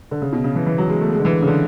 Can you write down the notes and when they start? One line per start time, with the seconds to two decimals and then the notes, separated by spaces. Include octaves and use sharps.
0.11 D3
0.22 C#3
0.32 B2
0.44 C#3
0.55 E3
0.66 E3
0.78 F#3
0.89 G#3
1.01 A3
1.13 G#3
1.19 D3
1.25 E3
1.42 C#3
1.47 D3